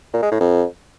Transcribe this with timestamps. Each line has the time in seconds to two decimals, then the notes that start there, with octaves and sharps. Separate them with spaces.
0.14 A#2
0.22 G#3
0.31 A2
0.40 F2